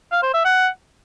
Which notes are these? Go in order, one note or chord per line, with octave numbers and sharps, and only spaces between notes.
F5
C5
E5
F#5